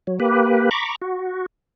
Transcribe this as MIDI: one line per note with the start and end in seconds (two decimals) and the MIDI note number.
0.07 0.19 54
0.20 0.70 58
0.20 0.70 67
0.20 0.70 71
0.71 0.96 82
0.71 0.96 83
0.71 0.96 85
0.71 0.96 86
1.02 1.46 66